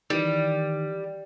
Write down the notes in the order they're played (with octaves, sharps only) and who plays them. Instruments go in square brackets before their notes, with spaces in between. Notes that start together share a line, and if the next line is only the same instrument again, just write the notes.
[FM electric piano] D#3 E3 [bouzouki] G3